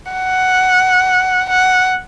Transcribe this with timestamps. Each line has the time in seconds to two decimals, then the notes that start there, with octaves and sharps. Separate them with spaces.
0.12 F#5
1.50 F#5